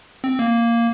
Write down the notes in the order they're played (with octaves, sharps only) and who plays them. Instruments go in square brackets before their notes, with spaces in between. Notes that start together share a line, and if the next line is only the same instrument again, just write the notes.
[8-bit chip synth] C4
A#3